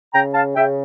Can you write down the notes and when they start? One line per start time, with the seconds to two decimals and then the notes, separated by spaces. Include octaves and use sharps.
0.13 C#3 G5 A#5
0.34 F5 A5
0.55 C#3 E5 G5